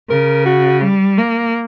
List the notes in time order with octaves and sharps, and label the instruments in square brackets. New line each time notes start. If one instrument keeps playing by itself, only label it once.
[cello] C#3 [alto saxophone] A#4
[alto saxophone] F#4
[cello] G3
A#3